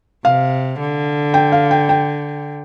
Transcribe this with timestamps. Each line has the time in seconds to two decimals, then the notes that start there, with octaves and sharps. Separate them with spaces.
0.25 C3 F5
0.80 D3
1.34 G5
1.52 F5
1.71 G5
1.89 G5